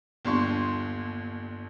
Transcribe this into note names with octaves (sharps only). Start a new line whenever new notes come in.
G1 D#2 D4 C6 C#6